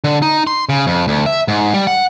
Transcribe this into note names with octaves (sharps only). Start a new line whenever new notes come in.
D3
D#4
C6
C#3
F2
D2
E5
G#2
G3
F#5